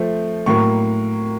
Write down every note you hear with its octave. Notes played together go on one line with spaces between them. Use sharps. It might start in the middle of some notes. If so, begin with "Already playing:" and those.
Already playing: F3 A3 C4
A2 F#3 A#3 C#6